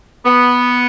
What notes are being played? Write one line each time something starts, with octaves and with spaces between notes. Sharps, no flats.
B3